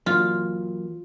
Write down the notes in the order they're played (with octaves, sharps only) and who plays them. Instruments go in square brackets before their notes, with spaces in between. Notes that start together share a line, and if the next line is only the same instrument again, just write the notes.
[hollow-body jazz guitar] E3 F#3 A#3 [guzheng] F4